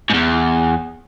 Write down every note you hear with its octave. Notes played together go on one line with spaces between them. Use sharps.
E2 G#2